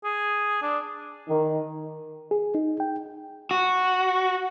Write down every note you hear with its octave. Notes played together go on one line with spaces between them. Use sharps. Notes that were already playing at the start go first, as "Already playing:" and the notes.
G#4
D4
D#3
G#4
D#4
G5
F#4